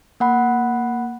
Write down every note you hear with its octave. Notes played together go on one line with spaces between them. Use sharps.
A#3 F#5 B5